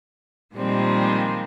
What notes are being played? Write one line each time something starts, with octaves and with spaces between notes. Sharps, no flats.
A#2 D#3 F3 G3 G#3 C4